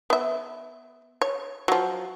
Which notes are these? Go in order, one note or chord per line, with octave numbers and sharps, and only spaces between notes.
B3 E5
C#5
F3 F#3